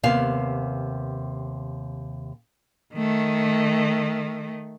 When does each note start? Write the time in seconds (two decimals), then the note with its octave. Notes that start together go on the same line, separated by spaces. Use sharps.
0.03 D#2 C3 B3 F5
2.94 D#3 A3